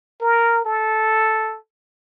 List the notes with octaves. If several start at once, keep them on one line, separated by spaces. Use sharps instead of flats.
A#4
A4